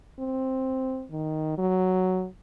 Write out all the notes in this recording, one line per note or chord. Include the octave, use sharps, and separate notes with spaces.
C4
D#3
F#3